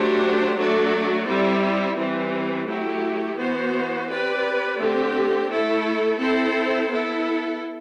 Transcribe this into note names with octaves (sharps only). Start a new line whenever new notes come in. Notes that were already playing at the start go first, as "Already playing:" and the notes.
Already playing: F#3 A3 D4 G4 C5
F#3 A3 D4 A4 D5
G3 C4 E4
E3 G3 C4
F#3 A3 E4 G4
E3 B3 F#4 C5
C4 G4 B4 D5
D3 A3 C4 G4
A3 E4 A4
C4 E4 A4 C5
B3 E4 A4